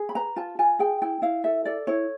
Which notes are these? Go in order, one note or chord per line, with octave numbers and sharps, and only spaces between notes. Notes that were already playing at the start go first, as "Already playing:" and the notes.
Already playing: G#4
B5
B4 A#5
F4 A5
F4 G#5
G#4 G5
E4 G5
E4 F5
A4 E5
A4 D5
E4 C#5